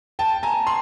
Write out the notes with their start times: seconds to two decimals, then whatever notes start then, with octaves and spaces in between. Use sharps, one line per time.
0.19 G5 A5
0.43 G#5 A#5
0.67 C6